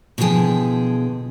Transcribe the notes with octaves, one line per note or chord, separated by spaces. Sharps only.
B2 D3 E3 F3 G#4 G5